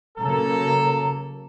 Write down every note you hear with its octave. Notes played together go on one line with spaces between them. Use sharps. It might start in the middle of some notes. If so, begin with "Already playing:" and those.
C#3 F#3 A#3 A4 A#5